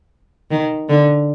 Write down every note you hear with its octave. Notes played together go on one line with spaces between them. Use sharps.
D#3
D3